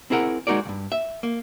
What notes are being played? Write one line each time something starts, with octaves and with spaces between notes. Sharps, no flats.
C4 E4 G#4 A#4 F#5
G#3 D#4 F#4 A#4 D5
C2 G2
E5
A#3